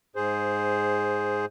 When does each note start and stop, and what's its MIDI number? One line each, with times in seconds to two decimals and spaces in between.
0.16 1.45 44
0.16 1.45 68
0.16 1.45 72